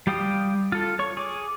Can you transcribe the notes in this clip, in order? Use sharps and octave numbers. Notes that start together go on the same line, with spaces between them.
G3 G4 F5 G5 D#6
F4 A4
C#5 C#6
G#4 D6